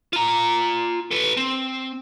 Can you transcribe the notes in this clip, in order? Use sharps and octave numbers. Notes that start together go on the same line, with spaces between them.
F4 A#5
A4 B4
C4